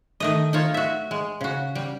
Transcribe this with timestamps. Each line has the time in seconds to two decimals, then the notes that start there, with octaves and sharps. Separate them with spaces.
0.20 D#3 A3 D#5
0.53 D#4 F4 C#5
0.74 F#4 E5
1.11 G#3
1.41 C#3 F#4
1.75 G3